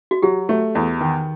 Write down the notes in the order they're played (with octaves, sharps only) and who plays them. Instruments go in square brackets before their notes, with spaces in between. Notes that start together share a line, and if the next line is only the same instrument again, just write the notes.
[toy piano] F#4
[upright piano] F#3 [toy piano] G4
[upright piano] A3
E2
D#3